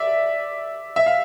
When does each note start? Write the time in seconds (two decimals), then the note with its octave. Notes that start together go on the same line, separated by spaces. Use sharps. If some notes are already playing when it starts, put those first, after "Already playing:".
Already playing: D5 E5
0.96 E5
1.06 F5